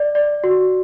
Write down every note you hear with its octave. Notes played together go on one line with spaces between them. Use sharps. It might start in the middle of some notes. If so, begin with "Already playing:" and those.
Already playing: D5
D5
F#4